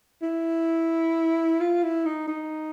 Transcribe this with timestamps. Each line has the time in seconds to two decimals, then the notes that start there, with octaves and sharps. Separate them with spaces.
0.22 E4
1.60 F4
1.83 E4
2.05 D#4
2.28 D#4